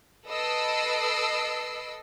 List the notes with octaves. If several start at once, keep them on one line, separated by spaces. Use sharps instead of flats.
A4 B4 D#5 E6 C7 D7